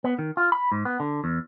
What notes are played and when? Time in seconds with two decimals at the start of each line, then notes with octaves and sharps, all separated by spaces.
0.04 B3
0.19 D#3
0.37 F4
0.52 B5
0.72 G#2
0.85 B3
1.00 D3
1.24 E2